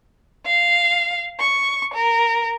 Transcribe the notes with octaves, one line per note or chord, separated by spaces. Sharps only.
F5
C#6
A#4